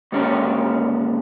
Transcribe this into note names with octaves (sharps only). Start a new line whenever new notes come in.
D#2 G#2 D3 C#4 D4 G4